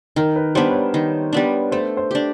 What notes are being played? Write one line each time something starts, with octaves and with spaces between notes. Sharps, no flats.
D#3 A#4
B4
G3 B3 D4 C5
C#5
D5
D#3
G3 B3 D4
A3 C5
C5
D4 G4